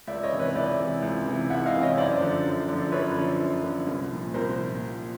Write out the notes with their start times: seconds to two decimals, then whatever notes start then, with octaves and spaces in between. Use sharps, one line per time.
0.07 C#2 D5 E5
0.23 C#5 D#5
0.32 C3 E3
0.39 B4 C#5
0.55 C#2 D5 E5
0.79 C3 E3
1.02 C#2
1.26 C3 E3
1.50 C#2 E5 F#5
1.66 D#5 F5
1.74 C3 E3
1.82 C#5 D#5
1.92 C#5
1.97 F#2 C5 D5
2.21 D3 F3
2.45 F#2
2.69 D3 F3
2.92 F#2 B4 C#5
3.17 D3 F3
3.40 F#2
3.64 D3 F3
3.87 C2
4.11 A#2 F3
4.34 C2 A#4 C5
4.59 A#2 F3